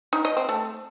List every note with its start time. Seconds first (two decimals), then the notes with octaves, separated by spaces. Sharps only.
0.13 D#4
0.25 D#5
0.37 C4
0.49 A3